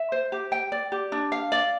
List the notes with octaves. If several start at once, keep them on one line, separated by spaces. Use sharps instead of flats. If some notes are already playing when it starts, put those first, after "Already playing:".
Already playing: E5
C5
G4
G5
D5
G4
D4
F5
D5